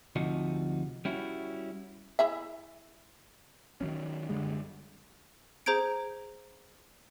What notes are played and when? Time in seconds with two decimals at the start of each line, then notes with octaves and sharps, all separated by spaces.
0.16 D2 C3 F3 D#4 F#4
1.05 G3 C#4 E4 F#4
2.19 E4 G#4 E5
3.81 D#3 F#3 C#4
4.29 F#2 D3 G3 G#3
5.66 G#4 C5 A#5 G6 G#6 D7